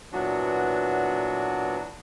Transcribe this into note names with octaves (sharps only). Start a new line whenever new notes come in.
A#2 E3 F#3 B3 D4 F#4